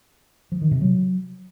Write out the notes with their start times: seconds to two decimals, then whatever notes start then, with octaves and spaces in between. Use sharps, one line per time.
0.52 F3
0.62 D#3
0.71 C3
0.81 F#3